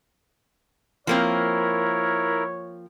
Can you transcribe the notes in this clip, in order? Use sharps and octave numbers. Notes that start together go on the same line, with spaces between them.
F3 A#3 C4 E4 A#4 C#5